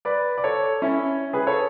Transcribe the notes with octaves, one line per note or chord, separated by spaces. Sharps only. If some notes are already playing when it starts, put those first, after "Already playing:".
B4 D5
D5
A4 C#5
C#4 E4
G#4 B4
A4 C#5